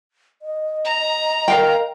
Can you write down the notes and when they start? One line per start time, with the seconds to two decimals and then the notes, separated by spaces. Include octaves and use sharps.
0.42 D#5
0.85 A#5
1.48 A#4 F5 G5